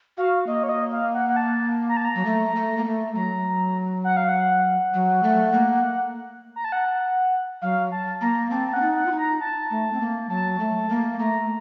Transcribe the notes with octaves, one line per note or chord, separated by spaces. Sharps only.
F#4 F5
A#3 D#5
C#5
D#5
F5
F#5
F#5
A5
A#5
A5
A#5
F#3
A3
A3
A#3
A3
F#3 A#5
F#5
F5
F#5
F#3
A3
A#3
A#5
A5
F#5
F#3 F5
A5
A#3 A#5
C4 A5
A5
C#4 F#5
D#4
F#5
F4
D#4
A#5
A5
A3
C4
A#3
F#3 A5
A3
A#3
A3 A#5